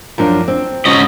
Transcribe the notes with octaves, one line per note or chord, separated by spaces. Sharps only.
F#2 F3 D4
C4
G#2 C#4 D#5